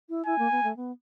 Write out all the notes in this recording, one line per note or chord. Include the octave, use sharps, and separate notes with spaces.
E4
E4 G#5
A#3
B3
A3
B3